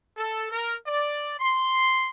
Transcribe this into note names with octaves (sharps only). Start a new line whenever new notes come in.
A4
A#4
D5
C6